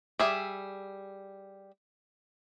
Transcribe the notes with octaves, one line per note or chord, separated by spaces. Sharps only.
G3 G#4 E5